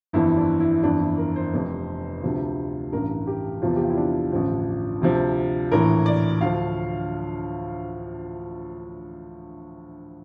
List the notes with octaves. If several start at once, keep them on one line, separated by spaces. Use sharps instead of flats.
G1 F2 E3 E4
D4
E4
G1 F2 E3 D4
E4
A#4
C5
F1 F2 C3
D2 C3 F3
A1 G2 E3 A#4
G4
E2 C3 F3 F4
G4
F4
E4
D4
A1 G2 D3 F3
D2 C3 F3
A#1 A2 E3 A#4
D5
D2 D3 F3 F5